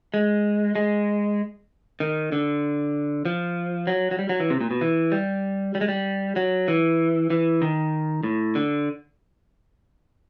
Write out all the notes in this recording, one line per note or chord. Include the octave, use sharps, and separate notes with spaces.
G#3
G#3
D#3
D3
F3
F#3
F#3
G3
F#3
E3
C3
A#2
B2
E3
G3
G3
G#3
G3
F#3
E3
E3
D#3
A2
D3